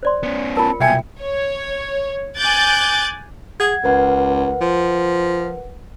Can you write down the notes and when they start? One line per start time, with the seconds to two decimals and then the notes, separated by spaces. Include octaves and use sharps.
0.03 C5 D5 C6
0.23 B3 C#4
0.57 F4 A#4 A5
0.80 C2 B2 E5 G5 G#5 G#6 C#7
1.20 C#5
2.37 G#5 D6 F#6 G6 A6
3.60 G#4 F#5 G#6
3.84 C#2 A#4 B4 F#5
4.61 F3